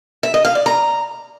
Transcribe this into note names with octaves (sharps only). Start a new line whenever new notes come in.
E5
D#5
F5
D5
A#5